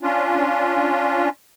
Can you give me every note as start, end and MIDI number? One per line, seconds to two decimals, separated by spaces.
0.01 1.29 61
0.01 1.29 62
0.01 1.29 65